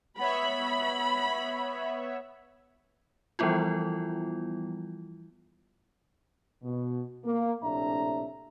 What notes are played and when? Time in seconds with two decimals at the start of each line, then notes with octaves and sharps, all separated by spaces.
0.18 B3 C#5 E5 B5
3.39 E3 F3 G3 B3 E4 F4
6.63 B2
7.25 A#3
7.62 A#1 A2 C3 D4 E5 A#5